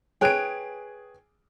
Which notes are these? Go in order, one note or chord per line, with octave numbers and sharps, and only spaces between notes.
G#4 B4 C#5 G5 D7